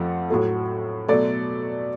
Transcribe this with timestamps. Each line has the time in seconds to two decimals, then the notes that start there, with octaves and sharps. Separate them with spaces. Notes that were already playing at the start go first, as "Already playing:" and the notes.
Already playing: F2 F3 A3 F#5
0.30 A2 F#3 A3
1.08 B2 F#3 A3 D5